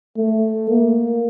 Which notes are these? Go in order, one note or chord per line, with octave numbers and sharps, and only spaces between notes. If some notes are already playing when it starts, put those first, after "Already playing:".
A3
A#3